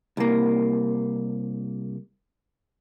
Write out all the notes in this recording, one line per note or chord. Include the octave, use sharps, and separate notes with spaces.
C2 A#3